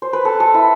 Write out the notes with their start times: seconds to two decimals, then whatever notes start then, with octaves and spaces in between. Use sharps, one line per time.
0.02 C5
0.13 B4
0.25 A4
0.40 A4
0.54 E4